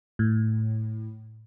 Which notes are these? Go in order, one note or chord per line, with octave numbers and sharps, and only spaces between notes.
A2